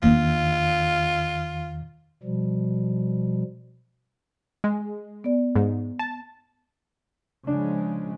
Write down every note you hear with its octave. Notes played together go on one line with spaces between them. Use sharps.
E2 D#3 A#3 D4 F4
B2 F3 G3
G#3
B3 D5
G#2
A5
C#3 F3 G#3 D4